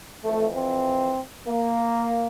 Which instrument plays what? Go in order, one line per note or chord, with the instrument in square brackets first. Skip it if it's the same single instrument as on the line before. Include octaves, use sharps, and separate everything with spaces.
[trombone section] F2 E3 A3
C4
A#3